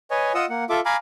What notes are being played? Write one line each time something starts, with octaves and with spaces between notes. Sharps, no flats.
B4 C#5 D#5 G#5
F4 D#5 F#5 D#6 E6
A#3 F#5
F4 A4 E5 D6
F5 G#5 A#5 B5 D6 F6